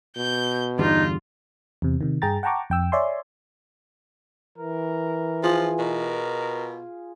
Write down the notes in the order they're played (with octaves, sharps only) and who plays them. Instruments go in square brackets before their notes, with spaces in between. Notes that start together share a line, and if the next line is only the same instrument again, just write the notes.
[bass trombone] B2 [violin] G6
[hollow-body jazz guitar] E2 G2 D3 [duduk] D#4 [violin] F4
[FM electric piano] E2 C3
C3 D#3
G2 G#4 G5 A#5 A6
F#5 G5 A5 A#5 C#6 D6
F2 G5 E6
C#5 D5 E5 G#5 C6
[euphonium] E3 [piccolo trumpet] A#4
[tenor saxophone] F3 [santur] F4 G#4
[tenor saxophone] B2 [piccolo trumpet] A#4